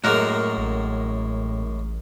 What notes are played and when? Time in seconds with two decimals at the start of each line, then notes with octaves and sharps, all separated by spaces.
0.04 F#2 A2 G#3 A#3 F#4 A#4
0.57 A1